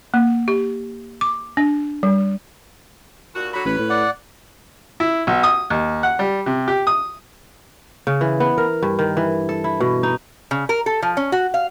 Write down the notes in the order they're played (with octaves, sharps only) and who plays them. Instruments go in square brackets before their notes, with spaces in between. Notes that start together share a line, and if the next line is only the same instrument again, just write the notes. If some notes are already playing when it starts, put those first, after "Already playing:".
[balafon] A#3
G4
D6
D4
G3
[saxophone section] D#2 A#2 F#4
[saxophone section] D3 F#3 F#4 [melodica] B5
[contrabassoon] A1 [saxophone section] C#4 B4
[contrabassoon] A2
[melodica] D5 F#5
[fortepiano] E4
B1
D#6
D#2
F#5
G3
C3
G4
D#6
[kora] C#3
E3
B3
A#4
G2
D#3
E3
A4
E4
B2
D#4
[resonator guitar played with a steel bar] C#3
A#4
A4
F3
C#4
F#4
F5